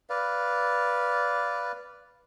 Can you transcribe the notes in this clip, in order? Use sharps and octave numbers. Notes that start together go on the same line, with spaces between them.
B4 D5 F5